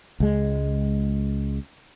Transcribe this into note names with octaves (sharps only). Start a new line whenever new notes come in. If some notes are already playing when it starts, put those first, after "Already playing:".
C#2 G#3